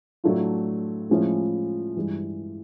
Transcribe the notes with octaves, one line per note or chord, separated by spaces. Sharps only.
A2 F#3 A3 D4 F4
A2 F3 G#3 C#4 E4
G2 E3 G#3